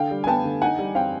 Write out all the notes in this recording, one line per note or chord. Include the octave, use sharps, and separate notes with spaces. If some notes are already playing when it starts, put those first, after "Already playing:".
Already playing: D3 F5 G5
G3
G#5
B3 G5 A5
D3
D#4 F#5 G#5
G3
C4 F5 G5